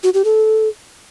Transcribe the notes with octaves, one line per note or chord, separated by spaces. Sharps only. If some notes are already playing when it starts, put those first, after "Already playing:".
F#4
G4
A4